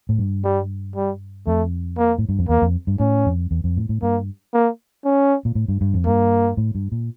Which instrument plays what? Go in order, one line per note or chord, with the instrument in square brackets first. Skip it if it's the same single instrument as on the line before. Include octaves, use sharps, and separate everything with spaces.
[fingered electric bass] A2
G2
[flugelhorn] G3
G3
[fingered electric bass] F2 [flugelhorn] A3
[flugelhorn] A#3
[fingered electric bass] A2
G2
F2
[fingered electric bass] E2 [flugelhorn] A#3
[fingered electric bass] F2
G2
[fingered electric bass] A2 [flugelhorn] C#4
[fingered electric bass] F2
E2
F2
A2
A2
[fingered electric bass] G2 [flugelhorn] A#3
[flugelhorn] A#3
C#4
[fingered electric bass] A#2
A2
G2
G2
F2
[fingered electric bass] G2 [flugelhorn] A#3
[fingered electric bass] A2
G2
A#2